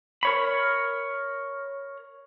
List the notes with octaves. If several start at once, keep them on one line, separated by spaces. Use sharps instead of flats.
A#4 C#5 B5